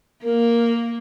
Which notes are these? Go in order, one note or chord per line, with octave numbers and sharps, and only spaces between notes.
A#3 A#4